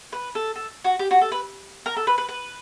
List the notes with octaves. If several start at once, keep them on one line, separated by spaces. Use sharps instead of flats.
B4
A4
A4
F#4
G4
F#4
A4
B4
A#4
A4
B4
B4
B4